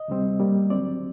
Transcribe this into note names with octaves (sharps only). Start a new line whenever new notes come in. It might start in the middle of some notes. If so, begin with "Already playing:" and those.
Already playing: D#5
D2 C3 G3 C4
A2 G3 A#3
D#2 D3 F#3 C4 D5